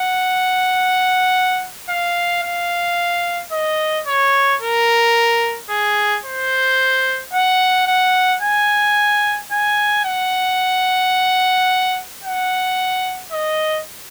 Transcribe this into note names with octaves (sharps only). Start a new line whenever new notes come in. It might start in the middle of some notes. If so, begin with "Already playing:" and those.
Already playing: F#5
F5
F5
D#5
C#5
A#4
G#4
C5
F#5
F#5
G#5
G#5
F#5
F#5
D#5